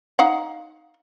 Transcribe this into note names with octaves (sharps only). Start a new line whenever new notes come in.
D#4 F5 F#5